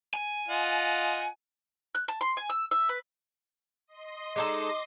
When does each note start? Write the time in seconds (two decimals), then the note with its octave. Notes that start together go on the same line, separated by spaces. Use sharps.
0.14 G#5
0.48 F4 D#5 F#5
1.95 F#6
2.08 A5
2.21 C6
2.37 G#5
2.50 E6
2.71 E5
2.89 B4
3.87 D#5 C6
4.36 G#3 D#4 A4 D6